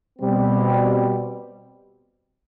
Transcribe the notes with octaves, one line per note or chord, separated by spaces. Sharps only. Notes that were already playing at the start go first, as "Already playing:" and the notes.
B2 G3 C4